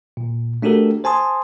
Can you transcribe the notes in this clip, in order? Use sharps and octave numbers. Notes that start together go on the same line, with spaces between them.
A#2
A3 D4 F#4 G4 A4 A#4
C5 G#5 A5 C6 D#6